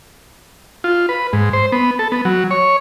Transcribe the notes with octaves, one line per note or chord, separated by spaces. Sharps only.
F4
B4
G#2
C5
B3
A4
B3
F#3
C#5